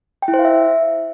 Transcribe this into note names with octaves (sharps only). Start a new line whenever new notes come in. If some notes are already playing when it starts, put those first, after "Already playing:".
G5
E4
C5
F5
E5